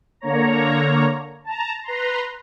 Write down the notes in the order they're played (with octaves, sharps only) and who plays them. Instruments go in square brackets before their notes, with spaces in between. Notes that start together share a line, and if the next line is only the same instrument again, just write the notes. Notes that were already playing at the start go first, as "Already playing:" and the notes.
[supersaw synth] D3 A#3 C#5 A#5
A5 A#5
B4 A#5 C6